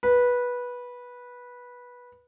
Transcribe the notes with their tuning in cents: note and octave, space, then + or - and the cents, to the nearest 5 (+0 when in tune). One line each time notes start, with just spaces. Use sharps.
B4 -15